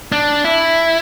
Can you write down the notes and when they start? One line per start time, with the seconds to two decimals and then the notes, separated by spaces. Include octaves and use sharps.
0.12 D4
0.44 E4